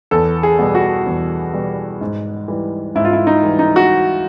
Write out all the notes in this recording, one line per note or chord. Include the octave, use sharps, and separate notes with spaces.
E2 A4
G#4
B2 G3
F#4
E2
B2 G3
G#2
E3 G3
G#2 E4
F4
E4
D#4
E3 G3
D#4
F#4